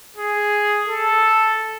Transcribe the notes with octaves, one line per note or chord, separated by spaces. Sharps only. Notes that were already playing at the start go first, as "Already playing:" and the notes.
G#4
A4